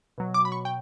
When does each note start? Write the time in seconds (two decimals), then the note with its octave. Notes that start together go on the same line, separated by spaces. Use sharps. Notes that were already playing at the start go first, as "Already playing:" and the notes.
0.18 B2 F#3
0.34 D6
0.45 B5
0.52 C#6
0.65 G5